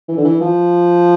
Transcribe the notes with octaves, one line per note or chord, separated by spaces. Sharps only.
E3
D3
E3
F3